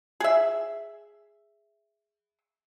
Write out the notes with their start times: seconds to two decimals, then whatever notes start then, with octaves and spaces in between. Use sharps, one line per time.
0.20 G#4 E5